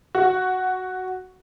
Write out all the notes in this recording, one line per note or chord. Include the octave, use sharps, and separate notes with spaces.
F#4